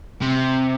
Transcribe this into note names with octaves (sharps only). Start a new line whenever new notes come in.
C3